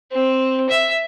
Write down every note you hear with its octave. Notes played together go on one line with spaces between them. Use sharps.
C4
E5